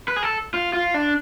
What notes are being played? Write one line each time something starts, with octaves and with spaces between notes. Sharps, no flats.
B4
G#4
A4
F4
F4
D4